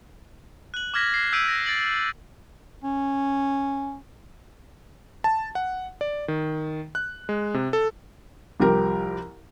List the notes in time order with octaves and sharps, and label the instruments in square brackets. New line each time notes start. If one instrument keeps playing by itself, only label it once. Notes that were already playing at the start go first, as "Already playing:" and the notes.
[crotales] F#6 F#7
D6 F6 G#6 A#6 B6
C7
E6 G6 B6 D7 D#7
A#6
A6 D7 F#7
[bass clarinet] C#4
[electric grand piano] A5
F#5
D5
D#3
F#6
G#3
C3
A4
[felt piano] C2 F3 G4 A#4